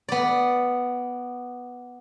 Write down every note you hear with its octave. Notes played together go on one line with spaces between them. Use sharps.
B3 D5